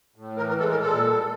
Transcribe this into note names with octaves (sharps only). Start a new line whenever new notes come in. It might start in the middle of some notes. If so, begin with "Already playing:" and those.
A2
E3 A#4
A#4
G#3 A4
A#4
A#2 A4
G3